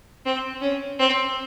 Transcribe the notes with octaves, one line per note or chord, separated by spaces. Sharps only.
C4
C#4
C4